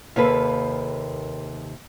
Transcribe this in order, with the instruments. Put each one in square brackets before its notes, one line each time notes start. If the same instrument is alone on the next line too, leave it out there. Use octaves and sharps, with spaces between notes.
[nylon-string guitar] D#2 C3 A#3 A4 B4